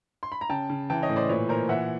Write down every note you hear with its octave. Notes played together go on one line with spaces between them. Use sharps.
C6
B5
A#5
C#3 G5 A5
C#3
E3 G5 A5
C#5 D#5
A2
C5 D5
A#2 B4 C#5
A#2 A#4 C5
E3 E5 F#5